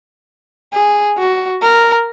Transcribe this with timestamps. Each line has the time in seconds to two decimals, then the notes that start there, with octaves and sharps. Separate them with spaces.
0.74 G#4
1.18 F#4
1.62 A#4